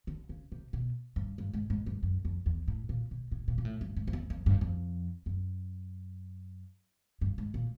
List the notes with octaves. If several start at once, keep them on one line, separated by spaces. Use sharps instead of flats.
D3
C#3
C3
B2
G2
G2
G#2
G#2
G2
F#2
F2
E2
A2
A#2
B2
A2
A#2
A#2
A2
G2
G#2
F2
E2
F2
G2
F2
F#2
G2
G#2
A#2